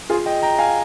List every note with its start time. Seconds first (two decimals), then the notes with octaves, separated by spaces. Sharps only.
0.09 F4 G#4
0.26 D#5 G5
0.43 G5 A#5
0.58 F5 G#5